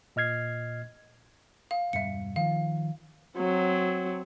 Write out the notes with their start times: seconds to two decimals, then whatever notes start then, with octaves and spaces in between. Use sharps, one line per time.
0.16 A#2 D#5 F6 G#6 C7
1.71 F5
1.93 E1 G2 E5 C#7
2.36 D#3 F3 F5
3.37 F#3 C4